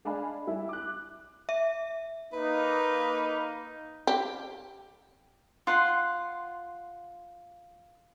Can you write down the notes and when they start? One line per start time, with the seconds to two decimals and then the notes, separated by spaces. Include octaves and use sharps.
0.05 G#3 D4 F5 G#5 B5
0.47 G3 E4
0.69 D6 F#6
1.49 E5
2.33 A#3 D#4 B4
4.07 G4
5.67 F4 F#5 C6